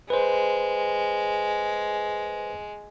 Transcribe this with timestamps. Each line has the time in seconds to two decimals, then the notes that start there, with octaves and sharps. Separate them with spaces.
0.10 G#3 B4 C5